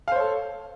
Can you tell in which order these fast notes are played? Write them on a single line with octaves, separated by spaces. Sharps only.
F5 C5 C#5 A4